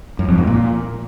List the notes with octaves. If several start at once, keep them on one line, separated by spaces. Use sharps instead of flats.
F#2
F2
G#2
A#2